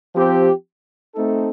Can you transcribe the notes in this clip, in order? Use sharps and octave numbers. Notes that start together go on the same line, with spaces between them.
F3 C4 G4
A3 C4 D#4 A4